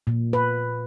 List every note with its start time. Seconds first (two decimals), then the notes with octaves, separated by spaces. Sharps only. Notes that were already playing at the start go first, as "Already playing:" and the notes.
0.07 A#2
0.33 B4